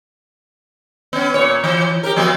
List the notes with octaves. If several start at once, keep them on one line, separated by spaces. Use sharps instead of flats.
B3 C#4
A#2 C#5
E3
G4 A#4
F3 A#3 B3